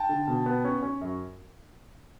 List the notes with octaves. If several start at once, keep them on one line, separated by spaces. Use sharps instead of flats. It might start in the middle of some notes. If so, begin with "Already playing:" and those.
Already playing: G5 A5
D3
B2
B3
C#4
C#4
F#2